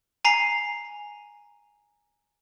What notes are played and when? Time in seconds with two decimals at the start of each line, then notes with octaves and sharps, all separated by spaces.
0.25 G#5 A#5 C7